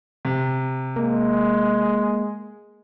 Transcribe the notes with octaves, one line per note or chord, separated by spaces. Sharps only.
C3
G#3 A#3